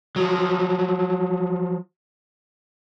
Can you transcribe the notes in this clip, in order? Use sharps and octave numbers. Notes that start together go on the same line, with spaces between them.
F3 F#3